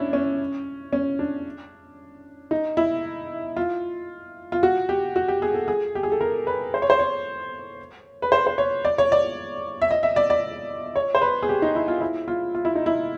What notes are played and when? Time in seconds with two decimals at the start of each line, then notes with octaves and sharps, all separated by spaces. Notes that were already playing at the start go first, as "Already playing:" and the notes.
Already playing: C#4 D4 E4
0.13 C#4
0.93 C#4
1.19 D4
2.51 D#4
2.77 E4
3.56 F4
4.52 F4
4.63 F#4
4.89 G4
5.16 F#4
5.28 G4
5.42 G#4
5.54 A4
5.68 G#4
5.95 G4
6.03 G#4
6.12 A4
6.21 A#4
6.47 B4
6.74 C5
6.82 C#5
6.90 C5
6.99 C#5
8.22 B4
8.32 C5
8.47 C5
8.58 C#5
8.85 D5
8.98 C#5
9.12 D5
9.82 E5
9.91 D#5
10.03 E5
10.16 D5
10.30 D5
10.96 C#5
11.15 C5
11.21 B4
11.43 G#4
11.49 G4
11.62 D#4
11.75 E4
11.88 F4
12.01 E4
12.28 F4
12.55 F4
12.65 E4
12.75 D#4
12.86 E4